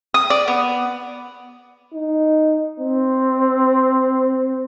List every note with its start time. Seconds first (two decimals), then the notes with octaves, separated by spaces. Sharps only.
0.14 D#6
0.30 D5
0.48 B3
1.94 D#4
2.80 C4